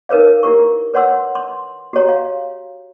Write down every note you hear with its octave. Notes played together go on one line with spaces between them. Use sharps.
D#4 A#4 B4 C#5 F5
E4 G4 A#4 C#6
B4 C#5 F#5 C6 E6
C6
F#4 G4 C#5 A#5
F5